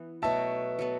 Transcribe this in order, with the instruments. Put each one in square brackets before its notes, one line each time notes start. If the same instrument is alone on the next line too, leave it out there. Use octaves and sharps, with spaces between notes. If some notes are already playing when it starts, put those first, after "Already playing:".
Already playing: [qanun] E3 B3
[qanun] B2 F#3 A3 F#4 [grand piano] E5 A5
[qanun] F#3 B3 A4